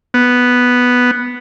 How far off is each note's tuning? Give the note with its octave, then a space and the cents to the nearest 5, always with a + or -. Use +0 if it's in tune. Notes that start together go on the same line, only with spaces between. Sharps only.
B3 +0